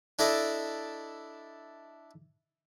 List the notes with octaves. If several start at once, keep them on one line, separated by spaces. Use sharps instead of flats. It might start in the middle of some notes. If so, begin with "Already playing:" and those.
D4 E4 A4 D5 D#5